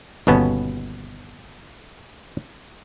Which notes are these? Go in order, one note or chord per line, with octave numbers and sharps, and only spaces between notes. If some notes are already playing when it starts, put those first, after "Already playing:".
G1 D#2 B2 B3 C#4 A5